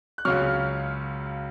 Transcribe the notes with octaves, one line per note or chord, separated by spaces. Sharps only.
F#6
C#2 C#3 F#3 C#6 F6